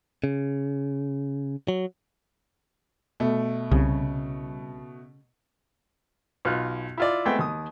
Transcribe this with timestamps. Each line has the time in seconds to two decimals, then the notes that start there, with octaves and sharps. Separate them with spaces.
0.24 C#3
1.68 F#3
3.20 B2 A3
3.72 C2 C#3
6.45 B1 F4 F#6
6.98 E4 F4 D5
7.25 G#3 A3 B3 C4 G5
7.39 D#2 D#6